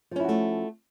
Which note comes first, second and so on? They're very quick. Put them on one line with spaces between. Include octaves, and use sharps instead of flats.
F3 C#4 E4 F#4 A3